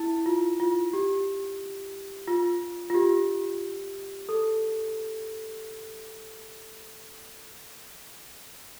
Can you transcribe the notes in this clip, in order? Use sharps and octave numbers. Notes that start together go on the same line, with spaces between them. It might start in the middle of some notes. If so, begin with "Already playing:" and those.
Already playing: E4
F4
F4
G4
F4
F4
G4
A4